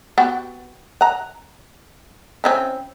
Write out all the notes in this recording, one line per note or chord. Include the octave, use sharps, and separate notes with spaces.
B3 F#4 G4
F#5 A#5
C4 C#4 E4